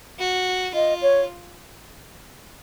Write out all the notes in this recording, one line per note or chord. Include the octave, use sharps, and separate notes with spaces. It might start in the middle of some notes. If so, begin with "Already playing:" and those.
F#4
F4 D#5
C#5